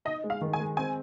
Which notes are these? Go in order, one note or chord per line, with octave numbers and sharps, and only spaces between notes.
D#4 D#5
G#3
F5
D#3
G#5
G#3
C4 G#5